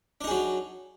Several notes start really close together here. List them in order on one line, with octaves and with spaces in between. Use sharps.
D4 D#4 G#4 F#3